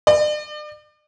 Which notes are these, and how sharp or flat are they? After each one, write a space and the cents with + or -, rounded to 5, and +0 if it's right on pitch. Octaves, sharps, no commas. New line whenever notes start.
D5 +40